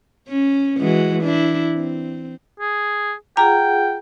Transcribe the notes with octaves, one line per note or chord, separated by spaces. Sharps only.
C#4
E3 G#3 F#4
D4 E4
C4
G#4
F4 G#4 F#5 G5 A#5